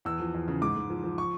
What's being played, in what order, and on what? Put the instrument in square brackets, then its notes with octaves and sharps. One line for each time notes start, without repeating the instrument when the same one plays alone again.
[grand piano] E2 E6
F3
E2
C#3
G#2 D6
G#2
F3
F3
C#6